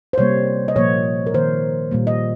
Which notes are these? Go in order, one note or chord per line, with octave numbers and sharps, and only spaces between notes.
C5
C3 G3 A#3 C#5
D#5
A#2 F3 A#3 C#5
A#4
D#3 A#3 C5
A#2 G3 A#3
D#5